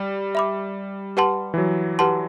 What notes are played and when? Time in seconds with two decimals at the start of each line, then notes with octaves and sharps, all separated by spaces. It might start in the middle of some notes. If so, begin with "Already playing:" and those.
Already playing: G3
0.35 E5 B5 D6
1.17 G4 B4 F#5 A5 C6
1.54 E3
1.58 F#3
1.99 G4 B4 F#5 A5 C6